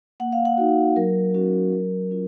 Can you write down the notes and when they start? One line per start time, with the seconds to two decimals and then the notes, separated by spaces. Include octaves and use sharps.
0.20 A#3 F#5
0.32 F5
0.45 F#5
0.58 D#4 F#4
0.96 F#3 A#4
1.34 C#4 F#4
1.72 F#3
2.10 C#4 F4